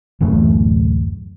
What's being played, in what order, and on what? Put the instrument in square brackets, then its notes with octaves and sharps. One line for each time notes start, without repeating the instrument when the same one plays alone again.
[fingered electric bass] D1 F#2 E3 A3